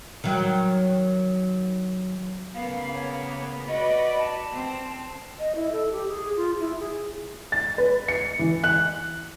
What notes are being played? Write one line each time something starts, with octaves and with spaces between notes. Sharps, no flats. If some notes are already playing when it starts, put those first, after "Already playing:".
D#3 F#3
C#3 A#3 B3 F5
C#5
F#4 B4 D5 D#5
A5
C4
D#5
E4
A4
G4
G#4
F4
E4
G#4
A6
B4
C#7
E3
F#6